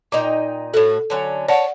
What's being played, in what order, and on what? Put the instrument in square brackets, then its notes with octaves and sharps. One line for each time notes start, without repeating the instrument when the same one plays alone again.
[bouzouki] A#2 D#4 G5 [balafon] D6
[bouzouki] A2 F#4 [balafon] A4
[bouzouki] D3 F#3 C#4
[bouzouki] C#5 A5 [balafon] D5 F#5